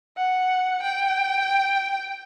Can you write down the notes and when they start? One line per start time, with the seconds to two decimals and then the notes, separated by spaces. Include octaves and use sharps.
0.17 F#5
0.82 G5